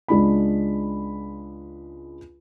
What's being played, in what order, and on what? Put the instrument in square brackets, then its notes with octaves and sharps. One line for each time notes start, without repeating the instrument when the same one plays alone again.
[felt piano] C#2 G#3 D4 B5